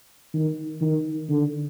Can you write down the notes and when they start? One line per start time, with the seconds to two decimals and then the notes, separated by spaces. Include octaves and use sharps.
0.34 D#3
0.82 D#3
1.29 D3